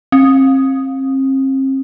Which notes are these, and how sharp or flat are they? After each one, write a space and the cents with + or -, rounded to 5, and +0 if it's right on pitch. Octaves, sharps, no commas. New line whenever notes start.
C4 +40